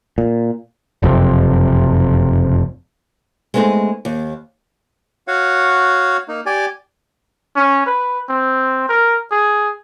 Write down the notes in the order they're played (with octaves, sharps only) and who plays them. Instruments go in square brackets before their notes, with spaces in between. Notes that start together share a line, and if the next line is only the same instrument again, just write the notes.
[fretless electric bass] A#2
[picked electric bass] F#1 F2 C3
[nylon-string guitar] G#3 A3 B3 C4 D#4 G#4
D#2
[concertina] F#4 C#5 F5 F#5
A#3 D#4
G4 D5 G#5
[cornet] C#4
B4
C4
A#4
G#4